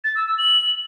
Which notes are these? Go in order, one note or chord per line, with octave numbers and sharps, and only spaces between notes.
A6
E6
E6
F#7